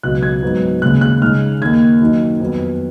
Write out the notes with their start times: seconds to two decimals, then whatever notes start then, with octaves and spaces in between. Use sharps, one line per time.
0.03 C#2 B2 F#3 F#6
0.23 G#6
0.43 G#2 F#3 B3
0.82 D#2 C#3 G#3 F#6
1.01 F#6
1.22 C#3 G#3 D#4 F6
1.62 D#2 D#3 A#3 G#6
2.00 F#2 D#3 A#3 D#4
2.40 F2 D#3 F#3 B3